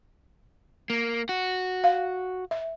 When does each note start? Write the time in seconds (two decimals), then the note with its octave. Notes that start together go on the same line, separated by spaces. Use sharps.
0.90 A#3
1.29 F#4
1.84 F5
2.51 E5